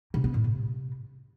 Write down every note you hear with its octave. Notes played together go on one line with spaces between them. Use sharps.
C3
B3
A2
C3